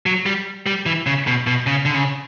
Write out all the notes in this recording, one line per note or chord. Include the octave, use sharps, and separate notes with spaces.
F#3
G3
G3
E3
C#3
B2
B2
C#3
D3
C#3